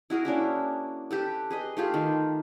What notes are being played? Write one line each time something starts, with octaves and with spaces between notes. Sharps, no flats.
E4 F#4 G#4 A#4
A#3 C#4 D4 E4
G4 A4 B4
G#4 B4 D#5
A3 F4 G4 G#4
D#3